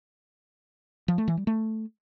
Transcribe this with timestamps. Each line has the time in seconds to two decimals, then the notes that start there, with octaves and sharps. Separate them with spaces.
1.08 F3
1.18 A3
1.28 E3
1.37 G3
1.47 A3